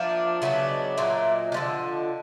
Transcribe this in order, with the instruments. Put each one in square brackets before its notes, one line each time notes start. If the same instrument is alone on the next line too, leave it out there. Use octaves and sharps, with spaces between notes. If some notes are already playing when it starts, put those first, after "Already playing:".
Already playing: [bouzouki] F3 A#3 D4 [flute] E5
[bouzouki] C#3 F#3 B3 D4 [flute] E5
[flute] D#5
[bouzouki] A#2 F#3 A#3 [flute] E5
[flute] E5
D#5
[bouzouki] D3 F3 G#3 [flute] D5
[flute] D#5